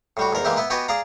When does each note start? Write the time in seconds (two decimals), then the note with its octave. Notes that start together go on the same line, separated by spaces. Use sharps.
0.17 A2 G3 F#4
0.33 E2 G#2 A#4 A#5
0.45 E3 G#3 A#3 E4 G4
0.57 B3 E4 B4
0.70 B3 F#4 G4 B4 D#5 G#5
0.88 G#4 D5 F5 A#5